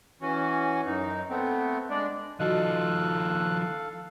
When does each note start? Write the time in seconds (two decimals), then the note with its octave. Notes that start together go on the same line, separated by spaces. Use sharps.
0.22 E3 C#4 F#4
0.86 F#2 D#4
1.30 A3 B3 C4
1.90 G#3 D4 D5
2.40 D#3 F3 F#4 A4 D#5 F5 F#6